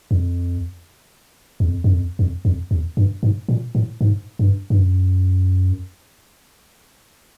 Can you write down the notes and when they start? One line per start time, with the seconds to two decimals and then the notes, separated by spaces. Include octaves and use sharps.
0.11 F2
1.60 E2
1.67 F2
1.84 F#2
1.92 F2
2.19 F2
2.45 F2
2.71 E2
2.97 G2
3.23 G#2
3.49 A#2
3.75 A2
4.01 G#2
4.39 G2
4.70 G2
4.79 F#2